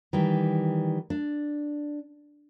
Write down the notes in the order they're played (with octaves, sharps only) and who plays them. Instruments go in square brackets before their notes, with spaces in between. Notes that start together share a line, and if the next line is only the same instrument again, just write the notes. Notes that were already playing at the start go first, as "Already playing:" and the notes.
[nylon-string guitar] D#3 E3 G3
D4